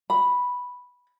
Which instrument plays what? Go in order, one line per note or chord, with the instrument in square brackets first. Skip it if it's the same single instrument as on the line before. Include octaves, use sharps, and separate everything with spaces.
[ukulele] B5